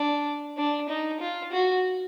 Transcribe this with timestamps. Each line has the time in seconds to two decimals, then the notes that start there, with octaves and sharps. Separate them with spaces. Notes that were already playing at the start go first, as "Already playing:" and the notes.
Already playing: D4
0.57 D4
0.89 D#4
1.20 F4
1.52 F#4